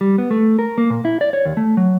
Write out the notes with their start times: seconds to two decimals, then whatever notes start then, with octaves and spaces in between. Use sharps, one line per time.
0.01 G3
0.18 B3
0.31 A3
0.59 A#4
0.78 A#3
0.90 A#2
1.05 E4
1.21 D5
1.33 C#5
1.45 D#2
1.57 A3
1.77 F#3